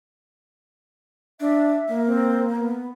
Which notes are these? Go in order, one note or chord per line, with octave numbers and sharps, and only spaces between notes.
D4 E5
A#3
C4
B3